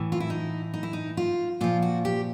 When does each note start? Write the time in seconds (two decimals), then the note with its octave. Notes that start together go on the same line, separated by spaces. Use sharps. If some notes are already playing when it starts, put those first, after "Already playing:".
Already playing: A2 E3
0.12 F4
0.20 E4
0.30 D#4
0.74 D#4
0.83 E4
0.93 D#4
1.17 F4
1.61 A#2 F3 F4
1.82 F#4
2.05 G4